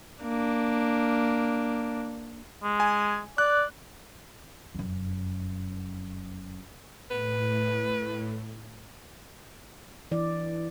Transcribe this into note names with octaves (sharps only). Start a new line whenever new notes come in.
A#3 D4
G#3
G#5
D5 F#6
F1 F#2
A2 B4
E3 D5